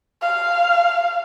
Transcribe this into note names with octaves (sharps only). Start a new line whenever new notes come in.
F5